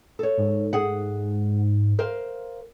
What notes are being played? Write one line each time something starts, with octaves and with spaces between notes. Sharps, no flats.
A4 C#5
G#2
G#4 F#5
A#4 C5 F5